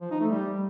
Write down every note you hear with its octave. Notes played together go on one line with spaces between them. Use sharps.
F3
D#4
A3
G3